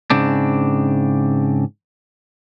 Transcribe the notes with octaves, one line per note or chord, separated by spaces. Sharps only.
G#2 C#3 C4 D4